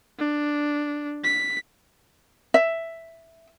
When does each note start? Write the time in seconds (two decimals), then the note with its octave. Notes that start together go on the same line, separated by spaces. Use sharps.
0.19 D4
1.24 B6
2.54 E5